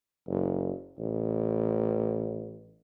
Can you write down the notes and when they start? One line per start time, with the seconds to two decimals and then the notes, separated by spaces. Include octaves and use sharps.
0.28 F#1
0.98 A1